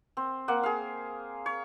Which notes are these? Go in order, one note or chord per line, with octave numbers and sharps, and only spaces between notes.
C4
A#3 F#5
G#4 F5
C#5